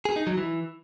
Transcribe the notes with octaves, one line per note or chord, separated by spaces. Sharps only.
G#4
D#4
F#3
E3